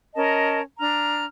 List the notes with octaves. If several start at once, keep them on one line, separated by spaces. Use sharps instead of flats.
C#4 A#4 D#5 A5
D4 A#5 F6